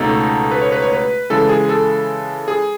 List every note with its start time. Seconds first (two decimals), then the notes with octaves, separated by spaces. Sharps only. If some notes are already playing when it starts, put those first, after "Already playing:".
Already playing: C#2 B2 A3 D#4 A4
0.51 B4
0.62 C#5
0.72 B4
0.82 C#5
0.93 B4
1.30 C#3 E3 G#3 A4
1.49 G#4
1.69 A4
2.48 G#4